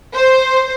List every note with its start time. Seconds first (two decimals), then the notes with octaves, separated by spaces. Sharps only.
0.14 C5